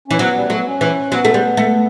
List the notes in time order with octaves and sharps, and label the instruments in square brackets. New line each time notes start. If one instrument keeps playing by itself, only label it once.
[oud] E3 [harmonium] C#4
[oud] F#3 [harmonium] B3
[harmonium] G3
[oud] F#3 [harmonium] A3
[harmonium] B3
C#4
[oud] E3
[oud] F#3 [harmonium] B3
[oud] A3
G3
A3